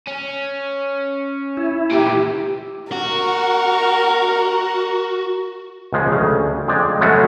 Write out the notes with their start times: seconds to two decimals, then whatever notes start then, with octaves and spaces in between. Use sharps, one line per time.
0.08 C#4
1.57 E4
1.91 A#2 E3 G4
2.92 F#4 A#4
5.93 C#2 C#3 F3 G#3
6.12 D2 C#3
6.67 F2 G#3 D5 G5
7.01 C#3 F#3 G#3 A3 C#4 F#4